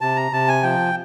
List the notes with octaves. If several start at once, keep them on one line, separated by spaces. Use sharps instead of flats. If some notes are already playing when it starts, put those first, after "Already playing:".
C3 A5
A#5
C3 A5
G#5
F3 G5